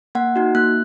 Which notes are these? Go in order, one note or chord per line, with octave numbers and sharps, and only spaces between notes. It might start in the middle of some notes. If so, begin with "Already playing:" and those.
A#3 F#5
D#4 F#4
A#3 F#6